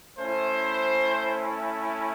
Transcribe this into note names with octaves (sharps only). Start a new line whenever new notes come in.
A3 C#4 E4 C5